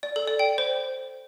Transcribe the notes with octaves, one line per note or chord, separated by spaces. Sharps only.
D5
A4
D5
G5
C5